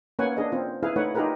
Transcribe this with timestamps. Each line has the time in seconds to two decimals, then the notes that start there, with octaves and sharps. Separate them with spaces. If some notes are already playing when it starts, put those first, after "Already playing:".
0.19 A#3 C#4 B4 C#5 F#5 G#5
0.37 D4 G#4 D#5
0.52 C4 F4
0.83 E4 G#4 B4 F5
0.96 A3 D#4 B4 C#5 F#5
1.15 D#4 F4 G4 G#4 A#4 B4